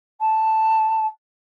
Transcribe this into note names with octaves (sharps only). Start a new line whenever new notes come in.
A5